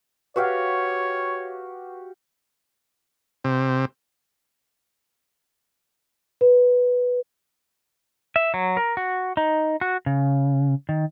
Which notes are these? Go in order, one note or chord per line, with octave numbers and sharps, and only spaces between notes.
F#4 G4 B4 C#5 F5 F#5
C3
B4
E5
F#3
A#4
F#4
D#4
F#4
C#3
D#3